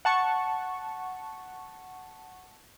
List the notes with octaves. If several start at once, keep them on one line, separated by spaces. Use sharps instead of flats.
F#5 A5 C#6